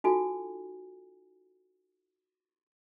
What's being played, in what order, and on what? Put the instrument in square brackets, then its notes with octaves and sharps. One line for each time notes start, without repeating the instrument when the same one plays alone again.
[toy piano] D#4 F4 F#4 A4 G#5